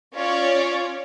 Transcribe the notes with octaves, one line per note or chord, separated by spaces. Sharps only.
C#4 F4 C#5 D5